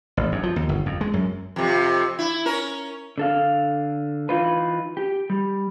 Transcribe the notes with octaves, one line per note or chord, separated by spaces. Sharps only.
A1
F#2
F3
D#2
G1
F2
G#3
F#2
F2 C3
E4
C#4 A#4
D3 A4 F5
E3 D#4 F4 B4
G4
G3